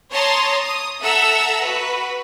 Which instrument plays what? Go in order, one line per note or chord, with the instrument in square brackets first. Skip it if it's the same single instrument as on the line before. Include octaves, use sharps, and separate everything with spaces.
[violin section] C#5 A5 A#5 C6 D#6
D#6
A4 E5 F#5 A#5 E6
F#4 B4